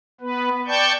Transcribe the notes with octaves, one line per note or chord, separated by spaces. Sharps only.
B3 B4
D5 G5 A5 C#6 G6